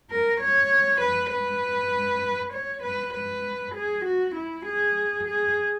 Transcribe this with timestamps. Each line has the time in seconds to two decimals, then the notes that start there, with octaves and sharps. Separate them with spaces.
0.10 A#4
0.40 C#5
1.01 B4
1.32 B4
2.53 C#5
2.83 B4
3.13 B4
3.75 G#4
4.05 F#4
4.35 E4
4.66 G#4
5.27 G#4